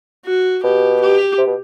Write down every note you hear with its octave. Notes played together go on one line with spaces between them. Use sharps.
F#4
B2 G4
G4
C3
B2